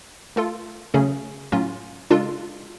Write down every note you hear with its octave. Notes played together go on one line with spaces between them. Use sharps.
A3 F4 A4
C#3 F#3 A3 C#4 G#4
A2 F#3 C#4 F4
C#3 G#3 D4 F4 A4